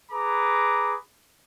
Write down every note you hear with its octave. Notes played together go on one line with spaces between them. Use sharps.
G#4 B4 A#5 D6